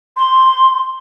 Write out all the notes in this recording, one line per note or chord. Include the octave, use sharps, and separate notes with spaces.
C6